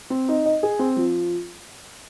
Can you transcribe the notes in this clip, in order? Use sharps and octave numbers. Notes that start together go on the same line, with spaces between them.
C4
D#4
D#5
G#4
C4
F3